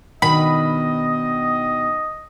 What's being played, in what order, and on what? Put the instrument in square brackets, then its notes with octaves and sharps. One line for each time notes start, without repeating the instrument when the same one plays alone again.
[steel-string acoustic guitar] B2 B3 D4 [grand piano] D#3 [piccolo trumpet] D#5 [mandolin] B5